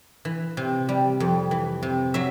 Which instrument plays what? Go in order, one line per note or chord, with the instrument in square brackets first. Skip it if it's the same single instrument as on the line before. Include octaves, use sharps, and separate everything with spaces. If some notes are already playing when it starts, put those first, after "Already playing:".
[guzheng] E3
C3
G3
F2
E3
C3
F#3 E5